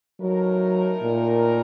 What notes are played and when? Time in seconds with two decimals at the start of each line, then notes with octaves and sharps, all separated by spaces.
0.20 A2 F#3 A3 D#4 A#4
1.03 A#2